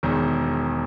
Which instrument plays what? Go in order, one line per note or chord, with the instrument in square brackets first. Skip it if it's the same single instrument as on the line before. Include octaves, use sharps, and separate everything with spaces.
[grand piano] E1 E2 D#3